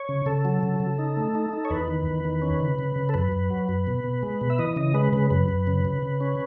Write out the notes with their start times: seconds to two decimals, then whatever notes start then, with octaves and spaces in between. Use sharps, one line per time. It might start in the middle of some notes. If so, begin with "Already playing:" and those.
Already playing: C#5
0.09 C#3
0.26 C#3 A4
0.45 F#3
0.63 C#3
0.80 C#3
0.99 D#4
1.17 A3
1.35 D#4
1.53 D#4
1.65 C#5
1.70 E2 B4
1.88 D#3
2.07 E2
2.25 D#3
2.42 C#4
2.60 C#3
2.79 C#3
2.96 C#3
3.09 A4
3.14 F#2 B4
3.32 F#2
3.50 F#3
3.69 F#2
3.87 B2
4.04 B2
4.23 G#3
4.41 B2
4.50 E5
4.59 E3 D#5
4.76 C#3 D#5
4.94 G#3 B4
5.13 C#3 B4
5.30 F#2 B4
5.49 F#2
5.67 C#3
5.85 C#3
6.02 C#3
6.21 C#4